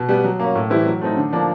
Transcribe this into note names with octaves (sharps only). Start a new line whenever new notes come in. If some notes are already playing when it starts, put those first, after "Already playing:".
Already playing: B2
G3 B3
F#3
A#3 C#4
A2
E3 G3 C4 E4
F#3
A3 C4 D#4
D3
F3 A#3 D4